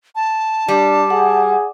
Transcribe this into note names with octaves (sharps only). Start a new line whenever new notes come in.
A5
G3 D4
G#4 F#5